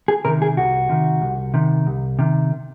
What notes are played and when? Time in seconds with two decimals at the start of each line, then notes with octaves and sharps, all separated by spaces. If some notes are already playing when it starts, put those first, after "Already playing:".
0.08 G#4
0.25 C3 D#3 A#4
0.42 G#4
0.57 C2 F#4
0.89 C3 D#3
1.22 C2
1.54 C3 D#3
1.87 C2
2.19 C3 D#3